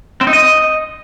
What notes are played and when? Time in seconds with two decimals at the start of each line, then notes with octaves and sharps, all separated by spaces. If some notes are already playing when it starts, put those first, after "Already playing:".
0.21 C4
0.27 D#4
0.33 D#5